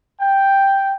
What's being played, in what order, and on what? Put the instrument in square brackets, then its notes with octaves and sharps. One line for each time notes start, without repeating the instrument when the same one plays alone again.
[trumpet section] G5